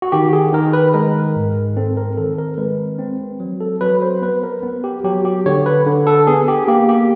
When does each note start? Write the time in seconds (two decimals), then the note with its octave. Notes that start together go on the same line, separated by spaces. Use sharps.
0.02 F#4
0.12 D#3 G4
0.33 G#4
0.53 D#3 A#4
0.73 B4
0.94 G#3 A#4
1.36 G#2
1.77 C4 A4
1.97 A#4
2.18 D#3 A4
2.39 A#4
2.58 G#3 B4
2.99 C4
3.40 F#3
3.60 A4
3.81 F#3 B4
4.02 C5
4.22 B3 B4
4.44 A#4
4.63 B3
4.84 G4
5.04 F#3 G4
5.25 G4
5.46 D3 C#5
5.66 B4
5.86 D3
6.07 A4
6.27 B3 G#4
6.48 G4
6.68 A#3 G4
6.89 G4